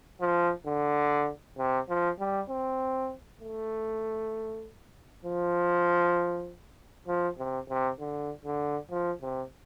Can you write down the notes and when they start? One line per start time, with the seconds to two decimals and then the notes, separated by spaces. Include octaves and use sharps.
0.20 F3
0.66 D3
1.58 C3
1.89 F3
2.19 G3
2.49 C4
3.41 A3
5.25 F3
7.07 F3
7.38 C3
7.69 C3
8.00 D3
8.45 D3
8.91 F3
9.22 C3